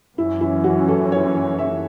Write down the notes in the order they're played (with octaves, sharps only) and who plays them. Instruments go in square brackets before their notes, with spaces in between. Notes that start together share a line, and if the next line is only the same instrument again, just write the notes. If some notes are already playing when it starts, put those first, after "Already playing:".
[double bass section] F#2 E3 C#4 [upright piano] E4
[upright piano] E4
F#4
A4
C#5
E5